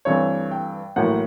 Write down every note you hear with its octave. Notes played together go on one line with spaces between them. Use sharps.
G2 E3 A3 C4 C#5
G5
A1 A2 F#3 A#3 F#5